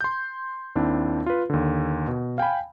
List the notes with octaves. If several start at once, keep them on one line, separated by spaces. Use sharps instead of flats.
C6 G6
D#2 C4 D4 E4
F4 B4
D#2 D3
B2
F5 G5 G#5 B5